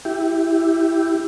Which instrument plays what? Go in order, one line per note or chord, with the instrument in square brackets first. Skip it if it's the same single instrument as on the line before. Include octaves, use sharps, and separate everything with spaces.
[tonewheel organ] E4 G4